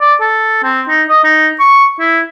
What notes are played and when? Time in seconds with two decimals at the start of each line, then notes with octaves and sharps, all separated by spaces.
0.01 D5
0.21 A4
0.64 C4
0.89 D#4
1.09 D#5
1.24 D#4
1.60 C#6
2.00 E4